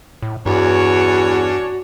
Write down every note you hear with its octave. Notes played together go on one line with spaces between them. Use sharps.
A2
E2 G2 C#4 D4 F#4 C#5